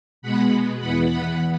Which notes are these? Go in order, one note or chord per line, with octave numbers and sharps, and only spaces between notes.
B2 G#3 B3 F#5 B5
E2 E3 B3 F#5 B5
F#5 B5